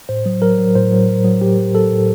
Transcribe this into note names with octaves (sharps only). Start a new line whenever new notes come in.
A2 C5
F#3
F#3 A#4
F#3
A2 C5
F#3
F#3
F#3
F#3 G4
F#3
F#3 A4
A2